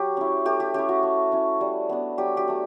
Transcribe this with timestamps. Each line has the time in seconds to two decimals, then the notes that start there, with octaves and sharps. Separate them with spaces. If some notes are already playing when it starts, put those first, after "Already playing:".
Already playing: F#3 G4
0.17 C#4 E4
0.46 A3 G4
0.60 G4
0.74 C#4 E4 G4
0.89 F#4
1.03 A3
1.32 C#4 E4
1.61 G3
1.89 B3 D4
2.18 F#3 G4
2.37 G4
2.48 A3 D4